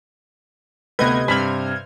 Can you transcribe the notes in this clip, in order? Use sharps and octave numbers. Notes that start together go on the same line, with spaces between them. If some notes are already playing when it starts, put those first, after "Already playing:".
D2 C3 B3 B4 D#5 G#6
G2 C3 C5 B5 F6 G#6